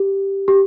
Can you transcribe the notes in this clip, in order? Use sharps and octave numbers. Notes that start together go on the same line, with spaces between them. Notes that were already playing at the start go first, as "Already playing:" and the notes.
Already playing: G4
G4